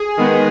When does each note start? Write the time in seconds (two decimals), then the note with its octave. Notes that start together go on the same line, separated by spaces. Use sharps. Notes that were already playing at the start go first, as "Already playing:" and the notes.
Already playing: G#4
0.17 D#3 G#3 B3